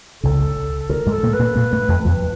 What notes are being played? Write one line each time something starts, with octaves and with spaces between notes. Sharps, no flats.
C#2 C#3 A4
D2 D3 A#4
G#2 G#3
A4
A#2 A#3
B4
A#2 A#3
A#2 A#3
A2 A3
F2 F3
F2 F3